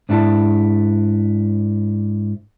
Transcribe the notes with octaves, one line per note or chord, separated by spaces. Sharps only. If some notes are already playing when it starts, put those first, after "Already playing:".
G#2 D4 E4 A5